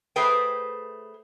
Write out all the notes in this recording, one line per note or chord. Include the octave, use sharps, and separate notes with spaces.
A3 G#4 B4 C5 G5